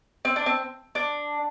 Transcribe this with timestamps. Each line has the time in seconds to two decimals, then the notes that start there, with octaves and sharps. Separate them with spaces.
0.25 C4
0.36 D4
0.46 C4
0.95 D4